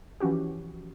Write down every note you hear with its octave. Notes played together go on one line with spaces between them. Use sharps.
E3 F3 C#4 F#4 G4